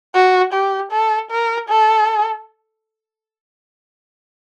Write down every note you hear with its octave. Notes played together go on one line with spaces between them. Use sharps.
F#4
G4
A4
A#4
A4